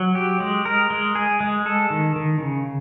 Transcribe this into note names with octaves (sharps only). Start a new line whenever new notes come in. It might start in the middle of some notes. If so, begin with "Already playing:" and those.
Already playing: F#3
G4
G#3
A#4
G#3
G#4
G#3
A4
D#3
D#3
C#3